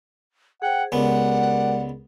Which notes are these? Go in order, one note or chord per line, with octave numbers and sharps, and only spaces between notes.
G#4 C5 F#5 G5
C#2 G#3 B3 G4 A#4 D5 F#5